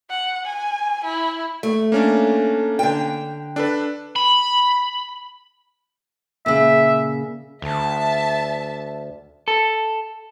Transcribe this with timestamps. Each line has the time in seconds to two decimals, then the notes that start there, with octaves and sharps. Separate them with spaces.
0.10 F#5
0.45 G#5
1.04 E4
1.63 A3
1.92 A#3 C#4 D4
2.79 D3 G5
3.56 D4 A4 B4
4.16 B5
6.46 A#2 C#3 E5
7.62 D2 E5 A5
9.48 A4